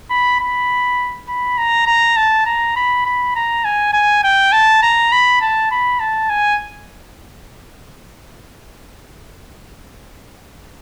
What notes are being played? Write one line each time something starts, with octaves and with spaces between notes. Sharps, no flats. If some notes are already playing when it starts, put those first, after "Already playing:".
B5
B5
B5
A#5
A#5
A5
A#5
B5
B5
A#5
G#5
G#5
G5
A5
A#5
B5
A5
B5
A5
G#5